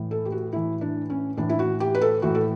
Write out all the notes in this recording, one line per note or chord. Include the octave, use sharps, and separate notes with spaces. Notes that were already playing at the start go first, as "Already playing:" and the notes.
Already playing: A2 E3
A4
G4
F#4
A2 E3 E4
D4
C#4
A2 E3 D4
E4
F#4
G4
B4
A4
A2 E3 F#4
A4